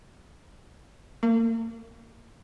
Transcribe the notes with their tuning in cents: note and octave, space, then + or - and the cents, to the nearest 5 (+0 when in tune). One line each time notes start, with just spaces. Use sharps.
A#3 -35